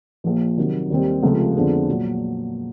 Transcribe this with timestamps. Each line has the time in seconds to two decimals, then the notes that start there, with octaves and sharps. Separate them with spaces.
0.24 A#1 A#2 F3
0.57 C3 D#3 F#3
0.90 D#2 D#3 G3 C4
1.23 C#2 C3 F3 A3
1.55 F2 D3 F3 G#3 B3
1.88 A#2 F#3